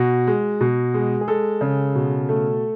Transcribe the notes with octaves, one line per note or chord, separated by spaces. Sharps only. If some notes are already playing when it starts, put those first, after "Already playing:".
Already playing: B2 F#4
G#3
B2
G#3
G#4
G#3 A4
C#3
B2
A3